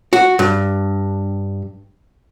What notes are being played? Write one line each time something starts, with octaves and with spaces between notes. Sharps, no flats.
F#4
G2